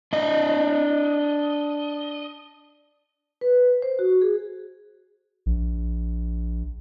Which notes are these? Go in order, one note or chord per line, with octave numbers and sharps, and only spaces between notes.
D4 D#5
B4
C5
F#4
G#4
A#1